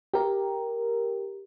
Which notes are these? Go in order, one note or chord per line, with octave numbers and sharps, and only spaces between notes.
G4 A#4